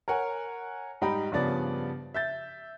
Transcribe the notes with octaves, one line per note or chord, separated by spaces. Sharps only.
A#4 C#5 F#5 G#5
G#2 G3 D#4 G5 A#5 B5
G2 C#3 F3 B3 D5 A6
E5 G6 A6